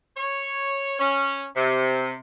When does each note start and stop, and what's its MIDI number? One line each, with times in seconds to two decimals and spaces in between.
0.16 0.99 73
1.00 1.44 61
1.55 2.14 48